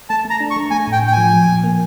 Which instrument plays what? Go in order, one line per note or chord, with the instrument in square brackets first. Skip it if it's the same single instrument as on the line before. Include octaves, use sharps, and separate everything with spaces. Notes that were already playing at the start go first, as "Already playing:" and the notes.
[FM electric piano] A3 [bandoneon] A5
[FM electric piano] A3
[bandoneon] A#5
[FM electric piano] D4
[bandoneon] C#6
[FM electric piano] A3
[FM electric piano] A3 [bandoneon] G#5
[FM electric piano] A2 [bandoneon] G5
[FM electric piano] A2 [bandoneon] G5
[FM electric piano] F3 [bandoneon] G#5
[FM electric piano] F3
A#2
A#3